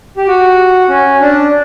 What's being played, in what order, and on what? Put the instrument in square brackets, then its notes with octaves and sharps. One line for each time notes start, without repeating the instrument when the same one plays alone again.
[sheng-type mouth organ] G4
F#4
C#4
D4